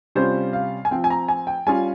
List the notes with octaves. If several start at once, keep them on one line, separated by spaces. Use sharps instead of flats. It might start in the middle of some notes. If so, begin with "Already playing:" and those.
C3 G3 C#4 F4 C5
F5
G#5
F3 C4 F4 G5
G#5
A#5
G#5
G5
G3 C#4 F4 G#5